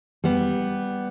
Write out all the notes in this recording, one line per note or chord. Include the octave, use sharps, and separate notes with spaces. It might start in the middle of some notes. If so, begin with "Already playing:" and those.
G3 B3